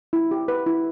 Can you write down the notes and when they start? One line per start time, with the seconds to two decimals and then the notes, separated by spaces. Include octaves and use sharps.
0.13 E4
0.31 G4
0.48 B4
0.67 E4